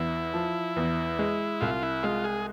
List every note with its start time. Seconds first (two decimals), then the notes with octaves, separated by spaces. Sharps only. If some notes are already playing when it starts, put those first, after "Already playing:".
Already playing: E2 E4
0.34 F3
0.76 E2
1.19 G#3
1.61 C2 F4
1.83 E4
2.03 G#3 F4
2.24 G#4